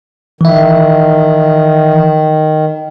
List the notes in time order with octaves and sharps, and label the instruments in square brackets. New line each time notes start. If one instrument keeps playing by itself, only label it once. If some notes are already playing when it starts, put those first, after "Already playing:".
[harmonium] D#3 [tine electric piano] E3 E5